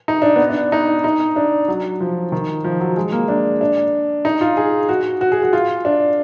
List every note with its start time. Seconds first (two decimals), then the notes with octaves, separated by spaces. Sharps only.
0.08 D#4
0.22 D4
0.36 B3
0.50 D4
0.72 D#4
1.04 D#4
1.36 D4
1.68 F#3
2.00 F3
2.32 D#3
2.64 F3
2.81 F#3
2.97 G#3
3.12 A#3
3.28 D4
3.61 D4
4.25 D#4
4.41 F4
4.57 G#4
4.89 F#4
5.21 F#4
5.32 G#4
5.43 F#4
5.53 F4
5.85 D4